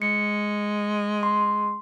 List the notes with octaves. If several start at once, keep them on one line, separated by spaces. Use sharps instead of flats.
G#3 C#7
C6